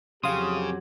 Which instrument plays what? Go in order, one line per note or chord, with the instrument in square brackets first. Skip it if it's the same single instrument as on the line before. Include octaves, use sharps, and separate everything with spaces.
[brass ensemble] F2 G4 [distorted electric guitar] C#3 [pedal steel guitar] F#3 C6 [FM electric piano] F5 D#6